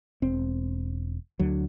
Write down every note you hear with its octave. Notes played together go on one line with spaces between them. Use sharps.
E1 C4
D2 D3 F#3